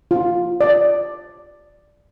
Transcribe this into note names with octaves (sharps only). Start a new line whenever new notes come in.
F4
D5